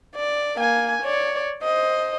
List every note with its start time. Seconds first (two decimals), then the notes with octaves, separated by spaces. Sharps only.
0.16 D5
0.57 A#3 G#5
1.02 C#5 D5
1.63 C5 D#5